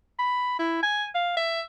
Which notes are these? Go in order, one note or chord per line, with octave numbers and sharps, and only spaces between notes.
B5
E4
G#5
F5
E5